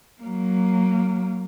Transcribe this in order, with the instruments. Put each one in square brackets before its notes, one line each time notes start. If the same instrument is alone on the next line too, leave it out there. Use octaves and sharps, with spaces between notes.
[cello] F#3 A#3